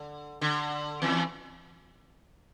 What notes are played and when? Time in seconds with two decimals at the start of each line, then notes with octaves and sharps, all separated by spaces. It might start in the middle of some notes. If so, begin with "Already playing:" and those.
Already playing: D3
0.41 D3
1.02 E2 E3